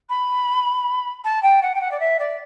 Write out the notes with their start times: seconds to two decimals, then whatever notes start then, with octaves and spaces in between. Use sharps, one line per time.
0.09 B5
1.24 A5
1.42 G5
1.62 F#5
1.75 G5
1.81 F#5
1.91 D5
2.00 E5
2.19 D5